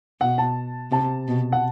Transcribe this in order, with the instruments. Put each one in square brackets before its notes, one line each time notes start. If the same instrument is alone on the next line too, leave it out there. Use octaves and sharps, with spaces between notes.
[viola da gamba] B2 [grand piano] F#5
[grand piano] A5
[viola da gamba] C3 [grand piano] A5
[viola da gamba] B2
[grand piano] F#5